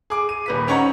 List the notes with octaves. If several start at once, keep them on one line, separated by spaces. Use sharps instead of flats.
G#4 D6
D#7
D#1 B4 B6
C4 C#4 D#4 C#5 F#5 A#5